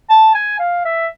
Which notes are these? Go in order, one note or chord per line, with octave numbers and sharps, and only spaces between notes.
A5
G#5
F5
E5